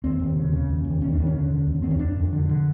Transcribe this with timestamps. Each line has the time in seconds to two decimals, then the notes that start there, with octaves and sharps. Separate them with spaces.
0.04 D#2 C4
0.19 D#2
0.36 C#3
0.53 C#3
0.69 D#2
0.85 D#2
1.01 D#2 C#4
1.13 D#2 D4
1.26 C#4
1.34 D3
1.51 D3
1.67 D#2
1.82 D#2 C4
1.91 C#4
1.99 F2 D4
2.16 F2
2.33 D3
2.49 D3